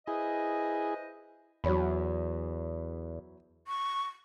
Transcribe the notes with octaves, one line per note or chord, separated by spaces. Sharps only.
E4 G#4 B4 C5 D#5
E2 F#3 C#5 B5
C#6